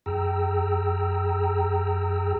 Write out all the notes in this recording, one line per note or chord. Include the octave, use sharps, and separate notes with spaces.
F#2 G#4 G5 A#5 E6